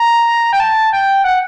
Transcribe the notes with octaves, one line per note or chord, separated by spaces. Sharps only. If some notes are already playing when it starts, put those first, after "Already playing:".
Already playing: A#5
G5
A5
G5
F#5